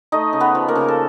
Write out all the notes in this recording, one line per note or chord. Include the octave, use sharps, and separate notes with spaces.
A3 D#4 D#5
C#3
B3 B4
F3
A#3 A#4
C#3
A4